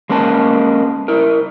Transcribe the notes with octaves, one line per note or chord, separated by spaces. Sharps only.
G#3 A#3 C#4 B4 A5
E4 A#4